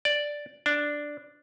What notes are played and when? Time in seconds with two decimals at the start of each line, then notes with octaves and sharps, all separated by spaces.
0.05 D5
0.66 D4